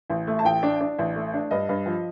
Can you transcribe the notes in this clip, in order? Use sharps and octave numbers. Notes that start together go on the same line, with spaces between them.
A1
A3
A5
A1 G5
D4
D4
A1
A3
D4
G2 D#5
G2
F3